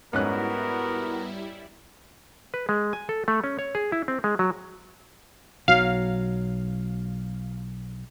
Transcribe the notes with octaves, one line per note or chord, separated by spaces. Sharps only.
G#2 G3 B3 C#4 E4 F#4 A#4 F#6
B4
G#3
G#5
A4
A3
C#4
C#5
G#4
E4
C4
G#3
F#3
B1 F#3 F5